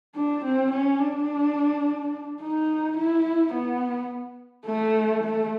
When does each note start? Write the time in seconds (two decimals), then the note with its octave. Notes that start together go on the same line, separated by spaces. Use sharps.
0.15 D4
0.44 C4
0.71 C#4
0.99 D4
2.41 D#4
2.97 E4
3.53 B3
4.66 A3
5.24 A3